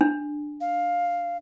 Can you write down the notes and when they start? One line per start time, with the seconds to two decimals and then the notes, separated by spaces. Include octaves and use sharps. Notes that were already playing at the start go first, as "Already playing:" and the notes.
0.01 D4
0.61 F5